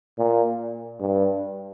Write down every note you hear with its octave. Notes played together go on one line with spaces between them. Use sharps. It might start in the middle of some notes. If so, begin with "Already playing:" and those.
A#2
G2